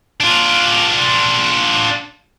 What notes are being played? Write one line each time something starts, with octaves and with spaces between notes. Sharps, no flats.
D4 F4